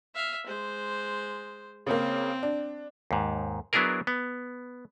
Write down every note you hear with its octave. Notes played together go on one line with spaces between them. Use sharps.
E5 F5
G#3 C5
C#3 A#3 C4
D4
D#2 G#2
F#3 B3 D4 E4 G#4 A#4
B3